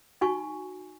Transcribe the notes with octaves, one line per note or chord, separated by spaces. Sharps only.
D#4 F#4 G#5 C#6